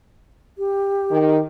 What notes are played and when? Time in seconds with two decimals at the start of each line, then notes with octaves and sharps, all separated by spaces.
0.58 G4
1.10 D#3